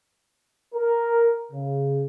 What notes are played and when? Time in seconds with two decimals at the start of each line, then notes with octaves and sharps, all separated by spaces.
0.74 A#4
1.52 C#3